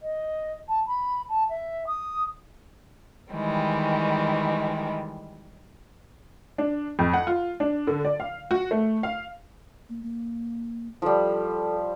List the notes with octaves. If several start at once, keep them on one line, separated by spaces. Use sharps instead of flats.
D#5
A5
B5
A5
E5
D#6
D#3 E3 G3 G#3
D4
F2
F#5
F4
D4
D3
D5
F5
F#4
A3
F5
A#3
A#3
F3 G3 A4